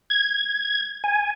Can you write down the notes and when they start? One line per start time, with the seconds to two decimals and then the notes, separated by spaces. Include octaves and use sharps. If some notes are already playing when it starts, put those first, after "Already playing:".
0.10 G#6
1.04 G#5